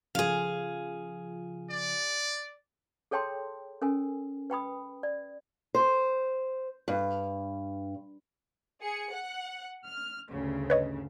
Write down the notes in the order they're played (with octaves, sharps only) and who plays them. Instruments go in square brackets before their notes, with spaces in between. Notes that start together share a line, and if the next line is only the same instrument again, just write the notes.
[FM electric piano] C#3 F3 F4 [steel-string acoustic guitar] G#4 F5
[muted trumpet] D5
[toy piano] G#4 A4 C#5 G5 A5 C6
C#4 A4 A#4 G#5
B4 G5 B5 D#6
D5
[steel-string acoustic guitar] C5
G2
[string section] G#4 C#7
F#5
F6
D2 G2 C#3
[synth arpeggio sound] B4 C#5 D#5